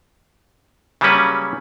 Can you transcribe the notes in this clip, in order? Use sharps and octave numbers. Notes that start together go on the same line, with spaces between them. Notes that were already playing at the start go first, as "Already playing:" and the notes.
C#3 F#3 G3 A#3 C#4 B4